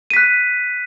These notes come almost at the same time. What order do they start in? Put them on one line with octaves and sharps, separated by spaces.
D#7 B6 F#6